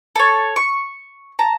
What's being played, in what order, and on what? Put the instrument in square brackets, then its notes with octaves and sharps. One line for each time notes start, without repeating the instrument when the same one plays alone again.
[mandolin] A4 C#5
C#6
A5 A#5